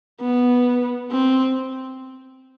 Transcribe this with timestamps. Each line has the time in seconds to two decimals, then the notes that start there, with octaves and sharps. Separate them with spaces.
0.21 B3
1.11 C4